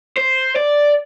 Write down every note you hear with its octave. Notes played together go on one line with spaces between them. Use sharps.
C5
D5